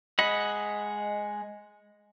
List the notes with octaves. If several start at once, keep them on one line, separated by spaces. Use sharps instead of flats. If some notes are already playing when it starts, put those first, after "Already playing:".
G#3 D#5 F#5 B5